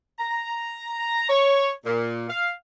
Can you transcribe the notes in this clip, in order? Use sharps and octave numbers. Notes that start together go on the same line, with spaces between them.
A#5
C#5
A#2
F5